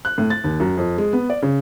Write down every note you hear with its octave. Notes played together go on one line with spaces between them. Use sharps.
F#6
A2
A6
D#2
F#2
F2
G#3
B3
D5
C#3